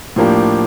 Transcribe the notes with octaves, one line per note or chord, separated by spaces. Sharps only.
A2 F3 A#3 D4 G4